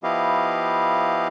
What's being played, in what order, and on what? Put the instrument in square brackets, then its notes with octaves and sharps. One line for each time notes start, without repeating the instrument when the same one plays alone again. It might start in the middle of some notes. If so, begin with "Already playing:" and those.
[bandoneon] F3 B3 E4 G4 D#5 F5